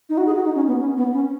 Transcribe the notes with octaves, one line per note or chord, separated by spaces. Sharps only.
D#4
F#4
G#4
F#4
D#4
C#4
B3
C#4
B3
C#4